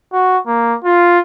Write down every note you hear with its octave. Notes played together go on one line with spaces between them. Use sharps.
F#4
A#3
F4